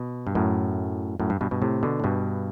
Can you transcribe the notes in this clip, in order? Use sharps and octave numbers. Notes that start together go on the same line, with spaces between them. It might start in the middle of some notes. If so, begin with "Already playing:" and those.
Already playing: B2
G2
F#2 A2
F#2 A2
G2
G2 B2
G2 B2
A2 C3
B2 D3
A2
G2 B2